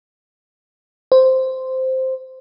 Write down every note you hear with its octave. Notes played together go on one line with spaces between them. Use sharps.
C5